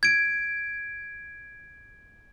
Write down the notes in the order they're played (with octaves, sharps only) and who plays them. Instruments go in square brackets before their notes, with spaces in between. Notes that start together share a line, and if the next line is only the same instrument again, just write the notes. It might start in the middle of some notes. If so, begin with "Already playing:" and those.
[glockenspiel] G#6 D7